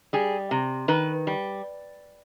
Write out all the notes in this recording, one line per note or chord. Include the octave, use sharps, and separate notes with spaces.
G3 G#4
C3
D#3 B4
G3